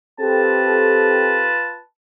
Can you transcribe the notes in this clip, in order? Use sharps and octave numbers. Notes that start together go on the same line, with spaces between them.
C4 F4 G4 A4 B4 A5